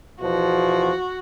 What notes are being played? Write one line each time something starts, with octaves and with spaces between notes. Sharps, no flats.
E2 B2 F3 F#4